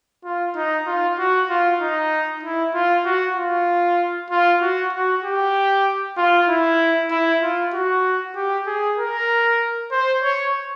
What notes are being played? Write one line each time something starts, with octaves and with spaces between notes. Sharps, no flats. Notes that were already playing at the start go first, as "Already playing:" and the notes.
F4
D#4
F4
F#4
F4
D#4
E4
F4
F#4
F4
F4
F#4
F#4
G4
F4
E4
E4
F4
F#4
G4
G#4
A#4
C5
C#5